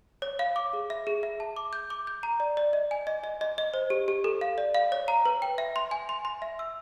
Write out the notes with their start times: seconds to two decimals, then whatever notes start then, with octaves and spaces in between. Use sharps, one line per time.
0.22 C#5
0.39 F5
0.56 D6
0.73 G#4
0.90 E5
1.07 G#4
1.23 E5
1.40 A5
1.56 D6
1.73 G6
1.90 D6
2.07 G6
2.23 A#5
2.40 D5
2.57 D5
2.73 D#5
2.91 G#5
3.07 D#5
3.24 D#5
3.41 D#5
3.58 D#5
3.74 C5
3.90 G4
4.08 G4
4.24 A4
4.41 F5
4.58 D5
4.75 F5
4.92 C#5
5.08 A#5
5.25 B4
5.42 G5
5.58 E5
5.76 C6
5.91 G#5
6.09 C6
6.25 C6
6.42 E5
6.59 E6